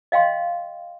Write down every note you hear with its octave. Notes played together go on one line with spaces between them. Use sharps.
D#5 F5 G5 C6